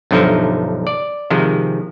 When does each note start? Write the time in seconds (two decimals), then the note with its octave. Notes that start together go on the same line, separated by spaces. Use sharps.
0.11 B1 G2 D3 F3 D#4 E5
0.87 D5
1.30 C3 D#3 F3 G#3